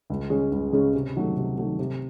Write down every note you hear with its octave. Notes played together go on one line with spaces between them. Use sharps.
C#2
C#3 G#3 C#4
C#2
C#3 G#3 C#4
C3
D#3 F#3 A3
C3
D#3 F#3 A3
C3